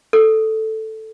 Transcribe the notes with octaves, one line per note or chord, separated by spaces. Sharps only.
A4